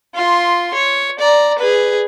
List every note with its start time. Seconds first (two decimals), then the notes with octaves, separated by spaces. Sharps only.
0.15 F4 C6
0.74 C#5
1.19 D5 A#5
1.58 G#4 B4